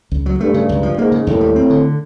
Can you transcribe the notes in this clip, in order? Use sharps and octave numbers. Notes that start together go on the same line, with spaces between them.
C#2
F#3
G2 A3
C#3
C#2
F3
G#2 A#3
C#3
D#2 A2
G3
C4
D3